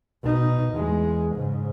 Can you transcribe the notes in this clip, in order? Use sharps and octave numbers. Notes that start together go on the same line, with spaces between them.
B2 D#4
E2 G#3
G#2 C#3